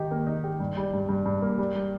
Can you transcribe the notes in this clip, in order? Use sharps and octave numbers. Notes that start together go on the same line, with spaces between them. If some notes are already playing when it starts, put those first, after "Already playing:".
Already playing: D#3 D#4 G4
A#3
D#4
G4
G2
G3
G2
G2
G2
A#3
G3
G3